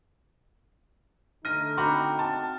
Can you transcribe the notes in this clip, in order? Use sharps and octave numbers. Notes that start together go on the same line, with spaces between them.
D3 A3 D#4 F6 A#6 D#7
C4 F#4 A#5 B5 D6
A5